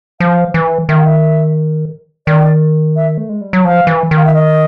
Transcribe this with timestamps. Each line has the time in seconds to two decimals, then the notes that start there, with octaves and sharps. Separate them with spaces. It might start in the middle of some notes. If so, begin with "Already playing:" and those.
0.20 F3 F5
0.54 E3
0.89 D#3 E5
0.97 F5
1.04 E5
2.27 D#3 D5
2.96 E5
3.18 A3
3.29 G#3
3.41 G3
3.53 F#3
3.64 F3 F5
3.87 E3
4.11 D#3
4.17 F5
4.25 E5
4.34 D#5